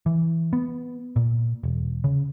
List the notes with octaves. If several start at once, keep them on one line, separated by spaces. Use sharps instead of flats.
E3
B3
A#2
E1
C#3